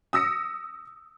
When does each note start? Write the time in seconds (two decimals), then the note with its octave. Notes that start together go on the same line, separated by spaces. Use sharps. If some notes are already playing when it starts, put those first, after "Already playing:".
0.13 D#6 E6 A#6 C#7